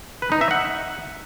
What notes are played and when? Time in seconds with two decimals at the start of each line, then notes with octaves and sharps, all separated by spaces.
0.22 B4
0.32 D#4
0.41 E5
0.51 F#5